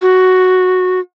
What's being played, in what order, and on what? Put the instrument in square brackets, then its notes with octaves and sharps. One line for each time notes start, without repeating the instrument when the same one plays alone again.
[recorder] F#4